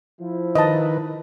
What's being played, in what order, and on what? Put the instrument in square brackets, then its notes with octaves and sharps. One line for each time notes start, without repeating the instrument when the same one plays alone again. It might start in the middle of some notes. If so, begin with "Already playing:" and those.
[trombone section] F3 E4
[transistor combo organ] D#3 B4 [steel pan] D#5 A5